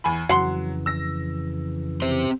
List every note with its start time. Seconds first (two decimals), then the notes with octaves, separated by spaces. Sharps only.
0.04 E2 G#5 B5
0.29 F2 C#3 E3 F#3 F#5 C6
0.86 E6 A#6
2.02 C4 G4 C5